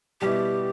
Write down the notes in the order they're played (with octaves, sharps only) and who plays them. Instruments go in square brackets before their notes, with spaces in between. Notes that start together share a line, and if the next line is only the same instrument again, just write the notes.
[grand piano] B2 G3 B3 E4 [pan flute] G4